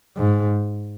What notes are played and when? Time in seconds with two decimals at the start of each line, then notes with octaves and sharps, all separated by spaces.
0.17 G#2